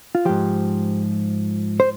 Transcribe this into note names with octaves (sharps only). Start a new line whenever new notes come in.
F4
G#2 F3 G4
C5